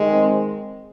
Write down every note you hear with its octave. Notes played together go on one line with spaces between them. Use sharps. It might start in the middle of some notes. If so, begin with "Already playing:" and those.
Already playing: D#3 G#3
C4